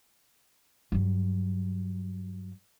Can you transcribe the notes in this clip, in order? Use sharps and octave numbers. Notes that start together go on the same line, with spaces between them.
G2 F#3